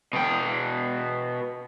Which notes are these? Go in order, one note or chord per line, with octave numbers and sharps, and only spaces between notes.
B2 G5